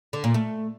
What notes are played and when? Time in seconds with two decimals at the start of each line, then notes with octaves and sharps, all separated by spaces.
0.13 D3
0.24 A#2
0.34 A3